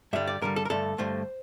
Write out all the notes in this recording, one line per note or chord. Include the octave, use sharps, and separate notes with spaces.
G2 D3 G3 E5
D5
G2 D3 G3 A#4
A4
A#4
G2 D3 A3 A4
G2 D3 A3 C5